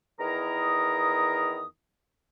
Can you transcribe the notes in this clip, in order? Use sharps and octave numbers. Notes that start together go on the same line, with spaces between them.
E2 D#3 E4 A#4 A#5 D#6